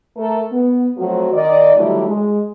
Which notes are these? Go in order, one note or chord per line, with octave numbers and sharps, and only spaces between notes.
A3 A4 A#4
B3
F3 F#3 A3 C4 F#4
D#3 D5 D#5
D3 D#3 F#3 G3 A3 E4
G#3